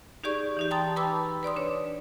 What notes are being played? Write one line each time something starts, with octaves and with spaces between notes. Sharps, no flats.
D#4 G4 G#4 D5 C#6
E3 D#4 G4
G5 A5 A#5 C6 D#6 A6
B4 G5 A5 B5 D6 E6
B4 D5 C6 D#6
D4 C#5